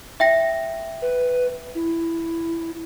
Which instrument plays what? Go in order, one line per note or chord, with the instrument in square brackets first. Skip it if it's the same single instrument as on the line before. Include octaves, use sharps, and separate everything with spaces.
[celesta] E5 G5 A#6
[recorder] B4
E4